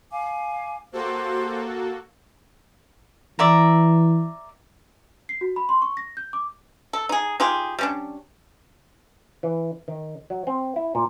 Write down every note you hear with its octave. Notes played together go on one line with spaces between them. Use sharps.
F5 G#5 D6
A#3 F#4 G4 A4 C5
E3 D5 E5 A#5
C7
F#4
B5
C6
C#6
A#6
G6
D6
A4
D#4 G#4
D#4 F4 G4 G#4
G3 C#4 D4
E3
D#3
F#3
C4
E4
A#2